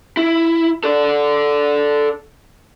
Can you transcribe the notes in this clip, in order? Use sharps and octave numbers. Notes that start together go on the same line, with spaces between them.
E4
A4 D5